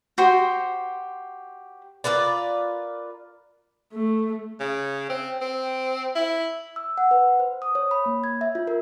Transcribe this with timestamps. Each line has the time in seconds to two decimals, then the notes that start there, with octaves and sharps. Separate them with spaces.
0.18 F#4 G4 C5 C6
2.04 F4 A#4 B4 D5
3.92 A3
4.60 C#3
5.09 C4
5.41 C4
6.15 E4
6.76 E6
6.98 F#5
7.11 B4
7.40 C5
7.62 D#6
7.75 C#5
7.91 B5
8.06 A#3
8.24 G#6
8.41 E5
8.55 F4
8.67 A#4